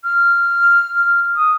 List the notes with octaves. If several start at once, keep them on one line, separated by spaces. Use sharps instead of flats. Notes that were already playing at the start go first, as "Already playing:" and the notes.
F6
D#6